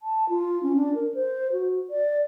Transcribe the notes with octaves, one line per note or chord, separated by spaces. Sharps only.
A5
F4
C#4
D4
A#4
C5
F#4
D5